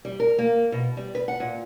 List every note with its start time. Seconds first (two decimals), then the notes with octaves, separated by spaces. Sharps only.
0.05 G3
0.20 A#4
0.38 A#3
0.72 B2
0.97 G3
1.15 B4
1.28 F#5
1.40 A#2